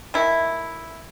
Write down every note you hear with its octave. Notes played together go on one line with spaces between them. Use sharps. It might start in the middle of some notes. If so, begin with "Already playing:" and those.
D#3 A3 E4